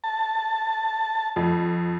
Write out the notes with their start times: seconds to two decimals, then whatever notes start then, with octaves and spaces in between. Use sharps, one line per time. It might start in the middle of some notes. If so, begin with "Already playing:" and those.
0.04 A5
1.36 F2